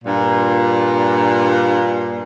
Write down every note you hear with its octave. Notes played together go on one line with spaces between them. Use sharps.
G2 A#2